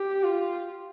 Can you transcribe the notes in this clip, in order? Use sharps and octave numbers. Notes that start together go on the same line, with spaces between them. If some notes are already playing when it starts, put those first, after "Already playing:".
Already playing: G4
F4